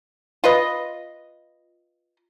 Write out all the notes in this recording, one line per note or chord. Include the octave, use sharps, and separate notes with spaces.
F4 B4 D#5